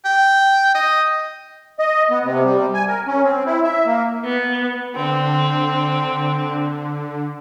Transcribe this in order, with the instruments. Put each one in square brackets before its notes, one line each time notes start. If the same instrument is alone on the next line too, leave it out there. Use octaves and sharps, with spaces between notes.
[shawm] G5
D#5
[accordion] D#5
B3
C3
G3
G#5
A#4
C#4
C4
E4
E5
A#3
[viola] B3
[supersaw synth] D3 [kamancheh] C4